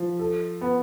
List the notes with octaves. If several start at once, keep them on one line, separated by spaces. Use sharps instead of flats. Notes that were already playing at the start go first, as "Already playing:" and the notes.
Already playing: F3
A4
B3